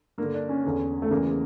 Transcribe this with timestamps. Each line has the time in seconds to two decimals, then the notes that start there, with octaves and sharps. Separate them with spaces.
0.18 G2 D3 A#3
0.34 D4
0.49 C#4
0.64 E2 D3
1.02 A3
1.11 E2 C#3 E3 A#3